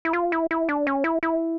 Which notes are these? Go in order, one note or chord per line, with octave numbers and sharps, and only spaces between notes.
E4
F4
E4
E4
D4
C#4
E4
E4